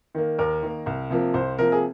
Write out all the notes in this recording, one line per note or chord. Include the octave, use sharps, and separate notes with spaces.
D#3 A#3
D#2 A#4
D#3 A#3
C2
C3 F3 A#3
C2 C5
C3 F3 A#3 A#4
G#4